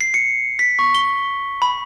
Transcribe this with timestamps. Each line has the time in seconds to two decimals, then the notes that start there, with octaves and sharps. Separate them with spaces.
0.01 C7
0.14 C#7
0.59 B6
0.79 C#6
0.95 G7
1.62 B5